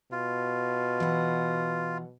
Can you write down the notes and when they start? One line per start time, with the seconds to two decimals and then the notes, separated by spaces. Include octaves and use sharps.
0.12 B2 F4
1.00 E3 F#5